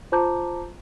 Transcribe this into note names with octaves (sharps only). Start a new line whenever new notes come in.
F4 C5 A5 A#5 D6 G6